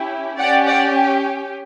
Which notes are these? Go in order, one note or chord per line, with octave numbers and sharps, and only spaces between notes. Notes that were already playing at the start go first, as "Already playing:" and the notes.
Already playing: C#4 E4 G4
C#4 G4 D5 F#5
D5 F#5